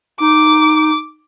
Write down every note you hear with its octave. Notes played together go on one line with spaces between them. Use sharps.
D#4 D6